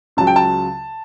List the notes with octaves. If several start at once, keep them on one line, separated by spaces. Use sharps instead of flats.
C#2 C#3 F#3 A5
G5
A5